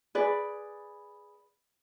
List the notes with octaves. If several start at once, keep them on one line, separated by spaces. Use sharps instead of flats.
G#4 B4 D5